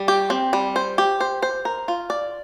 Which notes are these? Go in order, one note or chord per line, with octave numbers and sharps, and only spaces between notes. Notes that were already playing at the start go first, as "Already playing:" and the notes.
Already playing: G3
G4
C4
G3
C5
G4
C5
C5
A#4
F4
D5